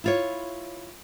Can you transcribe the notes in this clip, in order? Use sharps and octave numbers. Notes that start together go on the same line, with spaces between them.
E4 F4 C#5